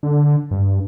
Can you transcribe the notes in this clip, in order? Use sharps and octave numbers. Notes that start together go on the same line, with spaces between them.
D3
G2